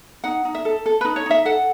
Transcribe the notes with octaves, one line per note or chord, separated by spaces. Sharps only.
D#4 F#5
D#4
E5
A4
A4
D#4 B4
C#5
D#4 E5
A4 F#5